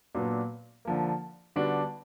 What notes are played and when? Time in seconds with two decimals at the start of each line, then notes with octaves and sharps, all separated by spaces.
0.15 A#2 F#3 B3 D4
0.85 D3 F3 A#3
1.56 D3 G3 B3 D4 F#4